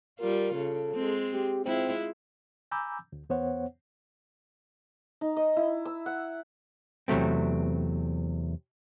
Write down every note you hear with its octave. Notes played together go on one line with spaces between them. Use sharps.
G3 F4 A#4
C#3 A4
G#3 C4
G4
G#3 C4 E4 F4
G#5 A#5 B5 D6 E6 G6
D2
E2 B3 C5 C#5 F#5
D#4
D#5
E4
E6
F#5
E2 C3 F#3 A3 C4